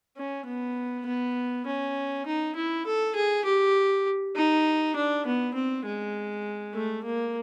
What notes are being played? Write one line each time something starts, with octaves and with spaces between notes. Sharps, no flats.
C#4
B3
B3
C#4
D#4
E4
A4
G#4
G4
D#4
D4
B3
C4
G#3
A3
A#3